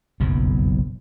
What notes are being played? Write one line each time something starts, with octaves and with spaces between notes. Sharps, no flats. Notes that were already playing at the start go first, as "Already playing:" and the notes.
F#1 B1 F2